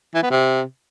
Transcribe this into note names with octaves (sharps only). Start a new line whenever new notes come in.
E3
B3
C3